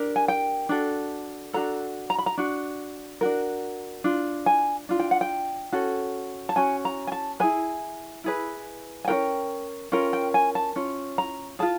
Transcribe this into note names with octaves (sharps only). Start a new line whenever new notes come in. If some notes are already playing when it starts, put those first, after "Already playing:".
Already playing: D4 G4 A#4
G#5
G5
D4 F#4 A4
D4 F#4 A4 A#5
A#5
B5
A#5
D4 F#4
D4 F#4 A#4
D4 F4
G#5
D4 F4
G5
F#5
G5
C#4 F#4 A4
A5
C#4 F#4 G#5
A#5
G#5
A5
E4 G#4 B4 G#5
E4 G#4 B4
G#5
C#4 F4 A#4 G5
C#4 F4 A#4 G5
G5
G#5
A5
C#4 F4
A#5
F4 G#4 A5